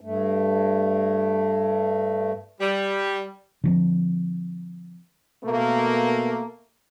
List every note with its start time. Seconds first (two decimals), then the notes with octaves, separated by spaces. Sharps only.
0.01 G2 A3
2.60 G3
3.64 D3 F3 C4
5.44 B2 A3 A#3